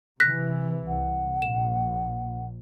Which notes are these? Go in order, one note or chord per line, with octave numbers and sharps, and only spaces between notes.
C3 E3 F#6 A#6 B6
C2 F#5
A#1 E7